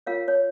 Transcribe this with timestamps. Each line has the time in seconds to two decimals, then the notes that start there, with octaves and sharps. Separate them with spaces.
0.07 F4 A#4 C#5 F5
0.28 C#5